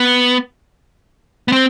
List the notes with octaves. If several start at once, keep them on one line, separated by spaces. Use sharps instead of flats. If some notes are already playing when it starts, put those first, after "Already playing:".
Already playing: B3
B3
C4